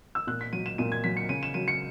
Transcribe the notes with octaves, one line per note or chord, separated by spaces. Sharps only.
E6
A#2 F#6
B6
F#3 D#7
E7
A#2 D#7
G#6
F#3 B6
C#7
C#3 D#7
E7
F#3 D#7
C#7